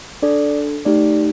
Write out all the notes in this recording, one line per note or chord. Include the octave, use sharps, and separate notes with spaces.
D4 A4 D5
A3 D#4 G4 D5